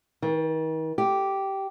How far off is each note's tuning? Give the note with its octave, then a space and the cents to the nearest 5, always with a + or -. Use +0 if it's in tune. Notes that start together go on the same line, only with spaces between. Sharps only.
D#3 +40
G4 -10